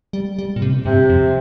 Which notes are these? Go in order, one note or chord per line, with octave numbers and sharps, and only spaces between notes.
G3
G3
A#2
C3
G2 C3
F2